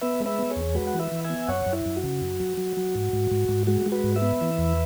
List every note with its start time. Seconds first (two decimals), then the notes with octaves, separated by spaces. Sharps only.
0.01 B3 B4 E5
0.20 G#3
0.26 B4 E5
0.39 B3
0.50 G#4 C#5
0.56 E2
0.75 G#3 F#4 B4
0.87 F#5
0.94 E3
0.99 B4 E5
1.12 E3
1.24 E5 G#5
1.30 B3
1.48 F#2 C#5 F#5
1.66 F#2
1.73 E4
1.85 F#2
1.96 F#4
2.04 C#3
2.21 F#2
2.40 F#3
2.57 F#3
2.77 F#3
2.95 G#2
3.13 G#2
3.31 G#2
3.49 G#2
3.67 G#3 F#4
3.86 G#3
3.92 F#4 B4
4.04 G#2
4.16 B4 E5
4.22 B3
4.41 E3
4.58 E2